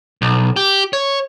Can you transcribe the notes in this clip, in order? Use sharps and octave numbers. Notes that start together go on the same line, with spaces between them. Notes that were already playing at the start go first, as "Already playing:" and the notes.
B1
G4
C#5